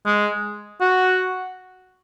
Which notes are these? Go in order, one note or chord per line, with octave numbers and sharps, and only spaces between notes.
G#3
F#4